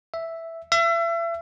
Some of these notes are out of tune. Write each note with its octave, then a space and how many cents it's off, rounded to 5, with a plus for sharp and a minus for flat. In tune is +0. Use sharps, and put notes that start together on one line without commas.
E5 +0
E5 +35